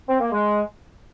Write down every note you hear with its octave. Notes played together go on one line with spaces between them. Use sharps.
C4
A#3
G#3